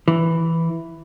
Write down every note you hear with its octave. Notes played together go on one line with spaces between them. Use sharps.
E3